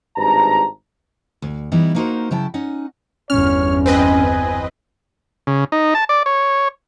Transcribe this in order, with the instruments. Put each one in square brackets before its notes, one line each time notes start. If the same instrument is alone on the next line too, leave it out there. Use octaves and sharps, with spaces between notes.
[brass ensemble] G#1 G2 A5 A#5
[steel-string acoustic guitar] D2
E3 G3 B3 D#4 E4
A#3 B3 D#4 F#4 A#4 C5
C#3 F#3 E4 G5 A5
C#4 D#4 F#5
[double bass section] G1 E2 [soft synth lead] C#4 [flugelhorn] C#5 [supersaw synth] F6
[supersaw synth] C4 B4 D#5 [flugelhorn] G#5
[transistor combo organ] C#3
D#4
A5
D5
C#5